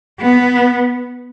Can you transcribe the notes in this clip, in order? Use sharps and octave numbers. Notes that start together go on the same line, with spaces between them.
B3